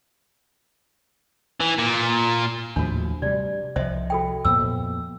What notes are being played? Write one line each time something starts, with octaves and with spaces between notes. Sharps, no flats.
E3
A#2
D#2 A2 F3 D4 F#4
C3 G3 D5
C2 F3 C5 D#5 E5
F#4 A4 G5
F2 A#2 B3 E6